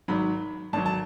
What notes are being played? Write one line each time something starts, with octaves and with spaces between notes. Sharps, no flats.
G#1 G#2 F#3 B5
G#1 G#2 F#3 A5
A5